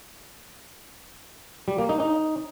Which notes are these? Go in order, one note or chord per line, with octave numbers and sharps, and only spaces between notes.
G3
A#3
D#4
D#4